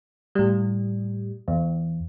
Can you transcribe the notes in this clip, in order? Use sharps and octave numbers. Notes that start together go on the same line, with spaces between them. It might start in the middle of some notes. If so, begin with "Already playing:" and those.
A2 G3
E2